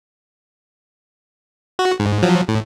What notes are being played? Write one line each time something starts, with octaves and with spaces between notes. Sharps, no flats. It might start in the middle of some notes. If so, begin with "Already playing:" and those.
F#4
G#2
F3 F#3
A2